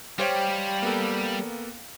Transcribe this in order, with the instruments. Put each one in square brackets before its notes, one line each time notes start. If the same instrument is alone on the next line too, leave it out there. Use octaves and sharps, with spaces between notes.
[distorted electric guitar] G3 [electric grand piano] G4 C5 C#5 [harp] F5 G5
[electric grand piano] A#3 B3 A4